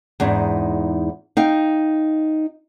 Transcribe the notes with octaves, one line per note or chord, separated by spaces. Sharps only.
E2 G#2 D4 D#4
D#4 F5 G5